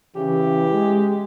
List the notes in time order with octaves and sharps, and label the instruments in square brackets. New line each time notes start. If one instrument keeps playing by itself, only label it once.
[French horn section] C#3 E3 [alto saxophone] G4
[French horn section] G#3